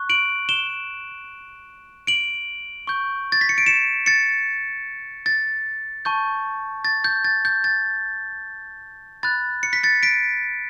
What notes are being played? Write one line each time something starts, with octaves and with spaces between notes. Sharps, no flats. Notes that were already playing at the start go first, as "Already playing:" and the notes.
Already playing: C#6 F#6
D7 F#7
E7 G7
D7 F#7
C#6 G6
A6
B6
C#7
D7
C#7 E7
A6 C#7
A6
A5 C#6 G6
A6
G6
A6
G6
A6
B5 F#6 A6
C#7
B6
A6 C#7
B6 D7